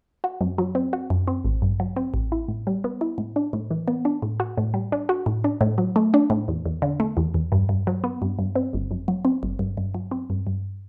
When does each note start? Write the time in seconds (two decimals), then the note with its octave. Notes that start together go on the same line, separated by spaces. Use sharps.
0.24 F#4
0.41 F#2
0.58 F#3
0.75 C4
0.93 F#4
1.10 F#2
1.28 C4
1.44 A1
1.62 G2
1.80 F#3
1.96 C4
2.14 A1
2.32 E4
2.48 A2
2.67 G3
2.84 B3
3.01 E4
3.18 A2
3.36 D4
3.53 A2
3.71 E3
3.88 B3
4.05 D4
4.22 A2
4.40 F#4
4.57 A2
4.74 G3
4.92 D4
5.09 F#4
5.26 A2
5.44 D4
5.61 A2
5.78 F#3
5.96 A3
6.14 D4
6.30 A2
6.48 E2
6.66 E2
6.82 D3
7.00 A3
7.17 E2
7.34 E2
7.52 G2
7.69 G2
7.87 F#3
8.04 B3
8.22 G2
8.39 G2
8.55 C4
8.73 G1
8.91 F#2
9.08 F#3
9.25 C4
9.43 G1
9.59 G2
9.77 G2
9.95 F#3
10.11 C4
10.30 G2
10.47 G2